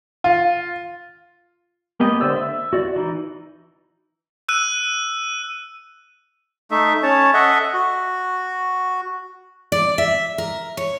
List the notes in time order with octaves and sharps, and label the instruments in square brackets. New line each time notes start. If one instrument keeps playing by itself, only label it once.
[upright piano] F4
[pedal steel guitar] A#3 B3 G4 D#5
D3 C5 D5 E6
E5
F#4 D5
E3 D#4
[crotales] E6 F#6 D#7
[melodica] A3 D#4 E5
C#4 C#5 A5
A4 D#5 E5 F#5
F#4
[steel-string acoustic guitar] D5
E5
A#4
C#5